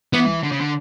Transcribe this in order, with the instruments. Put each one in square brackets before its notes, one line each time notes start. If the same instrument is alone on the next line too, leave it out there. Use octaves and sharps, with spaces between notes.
[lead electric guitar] E3 [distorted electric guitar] B3
[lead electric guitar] D3
C#3
D3